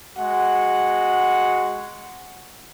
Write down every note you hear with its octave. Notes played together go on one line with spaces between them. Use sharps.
G#3 F#4 F#5